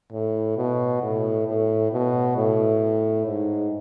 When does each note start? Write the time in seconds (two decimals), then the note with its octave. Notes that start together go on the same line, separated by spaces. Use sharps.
0.12 A2
0.57 B2
1.02 A2
1.47 A2
1.92 B2
2.36 A2
3.26 G#2